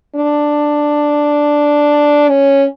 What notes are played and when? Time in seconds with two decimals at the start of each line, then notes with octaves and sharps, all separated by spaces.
0.15 D4
2.28 C#4